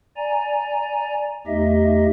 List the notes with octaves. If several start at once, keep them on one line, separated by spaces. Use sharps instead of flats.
D5 G#5 A#5
E2 A3 D#4 G4 D#5 E5